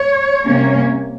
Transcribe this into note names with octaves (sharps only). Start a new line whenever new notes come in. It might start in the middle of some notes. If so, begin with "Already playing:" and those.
Already playing: C#5
C3 G3 A#3 C#4